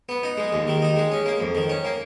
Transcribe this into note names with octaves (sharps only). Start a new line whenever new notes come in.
B3
D#4
G#3
D#2
D#3
D#4
G#3
C#4
A#3
F2
D#3
C#4
A#3